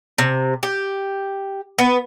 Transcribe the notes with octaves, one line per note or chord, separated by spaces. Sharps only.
C3
G4
B3